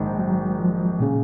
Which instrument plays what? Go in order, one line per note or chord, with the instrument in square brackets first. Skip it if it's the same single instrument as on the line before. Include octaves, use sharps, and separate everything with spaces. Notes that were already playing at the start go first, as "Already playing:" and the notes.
Already playing: [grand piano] A#1 G#2 D#3 [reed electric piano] G#3
[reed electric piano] F#3
F3
[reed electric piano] A#2 [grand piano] C#3